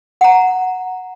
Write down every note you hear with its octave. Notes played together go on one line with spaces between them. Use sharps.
F#5 A#5